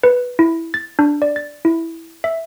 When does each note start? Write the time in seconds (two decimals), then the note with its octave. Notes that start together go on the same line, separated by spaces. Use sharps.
0.03 B4
0.39 E4
0.74 A6
0.99 D4
1.22 D5
1.36 A6
1.65 E4
2.24 E5